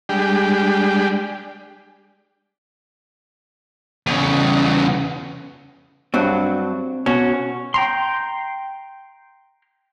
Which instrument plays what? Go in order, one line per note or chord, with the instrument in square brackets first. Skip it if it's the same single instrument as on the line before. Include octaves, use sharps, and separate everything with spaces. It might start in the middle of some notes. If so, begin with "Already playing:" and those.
[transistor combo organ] G3 G#3 D4 G4
[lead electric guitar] E2 C#3
[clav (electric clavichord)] G2 F#3 F#4 [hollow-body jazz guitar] C4 D4
[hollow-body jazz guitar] B2 [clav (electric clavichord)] C#4 F#4
[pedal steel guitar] G5 A#5 C6